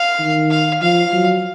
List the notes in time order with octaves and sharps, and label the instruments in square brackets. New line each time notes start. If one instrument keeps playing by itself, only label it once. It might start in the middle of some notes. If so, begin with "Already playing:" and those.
Already playing: [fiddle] F5
[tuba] D#3
[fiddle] F5
[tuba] F3 [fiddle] F5
[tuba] F#3